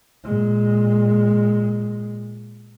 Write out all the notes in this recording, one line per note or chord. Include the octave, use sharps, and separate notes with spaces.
A#2 G#3